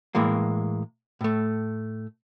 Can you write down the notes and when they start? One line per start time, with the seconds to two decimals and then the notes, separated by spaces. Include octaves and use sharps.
0.15 A2 E3 G#3 A#3
1.21 A2 A3